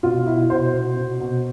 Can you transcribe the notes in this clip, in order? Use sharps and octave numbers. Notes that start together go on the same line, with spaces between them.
B2 F4
B2 E4
B2 C5
B2
B2
B2